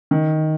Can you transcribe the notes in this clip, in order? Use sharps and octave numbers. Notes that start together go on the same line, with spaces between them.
D#3